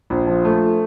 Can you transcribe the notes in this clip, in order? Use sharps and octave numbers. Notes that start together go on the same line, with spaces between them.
A#1
F3
A3